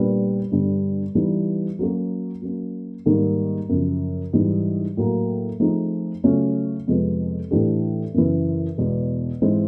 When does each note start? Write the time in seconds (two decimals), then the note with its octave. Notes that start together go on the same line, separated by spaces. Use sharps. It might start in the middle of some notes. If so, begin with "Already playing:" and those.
Already playing: A#2 G3 B3 D4
0.52 G2 D3 G3 B3
1.15 E3 G3 B3 D#4
1.79 F#3 A#3 C#4 F#4
2.42 F#3 A#3 C#4
3.06 G#2 D#3 G3 A#3
3.69 F#2 C#3 F3
4.33 G#2 E3 G3
4.97 A2 F#3 A#3
5.60 F3 A3 C4 D#4 G#4
6.24 C#3 F#3 A3 C#4 F4
6.87 F2 C3 F3 G#3 B3
7.51 A2 E3 A3 D4 G4
8.14 F#2 C#3 E3
8.78 E2 B2 G#3 B3
9.42 G#2 E3 G#3 C4 E4